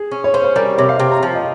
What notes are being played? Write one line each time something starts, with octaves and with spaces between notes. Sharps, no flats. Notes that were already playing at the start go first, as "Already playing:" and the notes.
Already playing: G#4
C#4
C#5
C#4 C5
C5
G3 A#4
C3 C#5
F5
C3 G5
A#5
F3
D#5